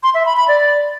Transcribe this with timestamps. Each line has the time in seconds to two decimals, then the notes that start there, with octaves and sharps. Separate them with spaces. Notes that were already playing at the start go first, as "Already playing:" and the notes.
0.03 C6
0.14 E5
0.26 B5
0.37 B5
0.48 D5